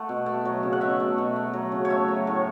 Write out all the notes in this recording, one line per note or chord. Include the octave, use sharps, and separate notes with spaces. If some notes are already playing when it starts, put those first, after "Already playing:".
Already playing: A3 F#5
B2
A3
F#3
C#3
F#5
B2 E5
A3
B2
A3
F#3
C#3
C#5
A3 E5
F#3
A2